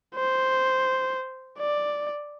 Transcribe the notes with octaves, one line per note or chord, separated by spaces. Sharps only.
C5
D5